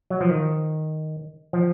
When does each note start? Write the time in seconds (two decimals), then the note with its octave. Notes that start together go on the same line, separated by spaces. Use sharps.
0.10 F#3
0.21 F3
0.29 D#3
1.53 F3